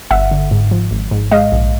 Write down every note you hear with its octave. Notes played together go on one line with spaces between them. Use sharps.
G1 E5 F#5
D3
G#2
F3
G#1
G#2
G#3 D#5 F5
A#1